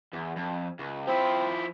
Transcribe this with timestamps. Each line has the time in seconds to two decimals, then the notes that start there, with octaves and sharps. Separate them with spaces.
0.13 E2
0.36 F2
0.79 C#2
1.07 F3 C4 E4